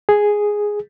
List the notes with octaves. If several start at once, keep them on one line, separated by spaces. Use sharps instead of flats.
G#4